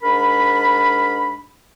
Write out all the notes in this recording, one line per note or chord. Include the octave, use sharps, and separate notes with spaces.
G#2 D4 A#4 B5